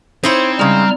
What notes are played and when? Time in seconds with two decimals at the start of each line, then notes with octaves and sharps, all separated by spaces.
0.24 C4 D#4 E4 C5 C#5
0.59 C#3 G3 G#3 A#5 F6